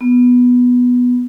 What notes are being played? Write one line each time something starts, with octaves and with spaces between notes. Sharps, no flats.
B3